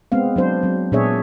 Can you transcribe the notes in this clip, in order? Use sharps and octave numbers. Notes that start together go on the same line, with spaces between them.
G#3 B3 C4 F5
F#3 D4 C5
F#3 C4
A#2 B3 D4 G#4 C#5 E5